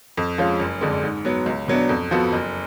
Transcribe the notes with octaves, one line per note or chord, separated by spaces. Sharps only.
F2
F3 G#3 C#4 F4
F#1
F2 D3 G#3 D4
G#2
F#3 B3
C#2
B2 F#3 B3 D4
F2
F3 B3 F#4 A4
F#1